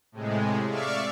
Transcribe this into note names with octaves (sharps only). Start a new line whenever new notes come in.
A2 C3 G#3
D5 E5 F5 C#6